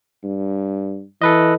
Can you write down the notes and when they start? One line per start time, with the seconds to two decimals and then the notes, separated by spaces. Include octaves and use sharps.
0.24 G2
1.22 E3 A4 B4 D#5